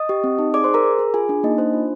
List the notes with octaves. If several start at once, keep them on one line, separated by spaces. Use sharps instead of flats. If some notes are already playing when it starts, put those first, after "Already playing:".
Already playing: D#5 D#6
G4
C4
D#4
G#4 D5 D6
G#4 C5 C6
A#4 A#5
G#4
G#4
F4 G#4 G#5
D4
A#3 D#4 D#5
D4 C5
F4